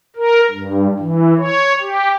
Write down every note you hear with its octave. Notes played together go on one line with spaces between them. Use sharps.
A#4
G2
E3
C#5
G4